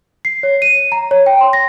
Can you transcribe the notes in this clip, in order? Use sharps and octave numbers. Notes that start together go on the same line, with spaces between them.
C7
C#5
D#7
A#5
C#5
G5
C6
A#6